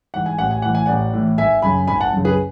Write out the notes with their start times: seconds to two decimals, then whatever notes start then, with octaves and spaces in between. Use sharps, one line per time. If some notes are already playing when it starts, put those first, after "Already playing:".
0.14 G#2 E3 F#5
0.26 G#5
0.38 A1 F#5
0.51 G#5
0.62 A2 E3 F#5
0.75 G#5
0.86 A1 D5 F#5
1.13 A2 E3
1.38 G#1 E5 G#5
1.62 F#2 C#3 G#5 B5
1.87 G#1 G#5 B5
2.01 F#5 A5
2.13 F#2 C#3
2.25 G#4 B4